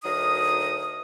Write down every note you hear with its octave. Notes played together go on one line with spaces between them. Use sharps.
D2 F#3 D#4 A#4 D#5 D#6